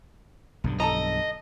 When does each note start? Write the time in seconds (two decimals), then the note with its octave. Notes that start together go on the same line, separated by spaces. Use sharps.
0.64 B1 G2 D3
0.80 A4 D#5 A5 A#5